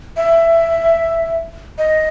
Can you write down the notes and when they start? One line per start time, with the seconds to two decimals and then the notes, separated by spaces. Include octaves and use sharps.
0.17 E5
1.78 D#5